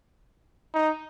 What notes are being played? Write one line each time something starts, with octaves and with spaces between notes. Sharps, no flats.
D#4